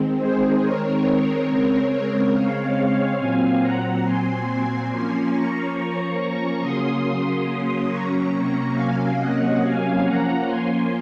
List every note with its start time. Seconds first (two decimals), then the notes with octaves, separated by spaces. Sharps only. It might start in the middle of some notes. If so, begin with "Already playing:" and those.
Already playing: D#3 G#3 C4
0.18 G#4 C5
0.61 A#4 C#5
1.47 C#3 G#3 C4
1.90 A#4 C#5
2.32 C#5 F5
3.18 A#2 F#3 C4 F5 G#5
3.61 F#5 A#5
4.04 G#5 C6
4.89 F3 A#3 C#4 G#5 C6
5.32 A#5 C#6
5.75 A#5 C#6
6.61 C#3 F#3 A#3 C#4 C6 D#6
7.89 A#5 C#6
8.32 C3 F#3 A#3 C#4
8.75 F5 G#5
9.17 D#5 F#5
9.60 F5 G#5
10.03 F3 A#3 C#4 F#5 A#5
10.46 G#5 C6